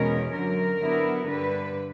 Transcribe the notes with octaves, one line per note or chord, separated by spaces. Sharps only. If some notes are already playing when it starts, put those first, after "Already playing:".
Already playing: E2 B2 G#3 C#4 A#4
F#2 D3 F#3 A#4
D3 F#3 B3 E4
G2 D3 G3 B4